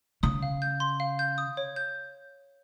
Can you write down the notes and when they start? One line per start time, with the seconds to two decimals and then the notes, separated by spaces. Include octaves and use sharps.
0.23 C#3 D#6
0.43 F5
0.62 G6
0.80 C6
1.00 F5
1.19 G6
1.38 D#6
1.57 C#5
1.76 G6